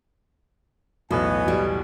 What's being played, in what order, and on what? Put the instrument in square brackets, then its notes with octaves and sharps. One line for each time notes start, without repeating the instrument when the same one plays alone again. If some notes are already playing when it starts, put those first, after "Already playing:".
[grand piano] B1 E2 A2 [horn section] B3 D#5 G#5 [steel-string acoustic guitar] F#4
[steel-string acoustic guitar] G3 F#4